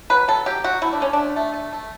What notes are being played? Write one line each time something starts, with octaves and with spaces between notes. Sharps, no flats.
F#3 B4
F#3 A4
F#3 G4
F#3 F#4
A3 E4
D4
D3 C#4
A3 D4
A3
A3
A3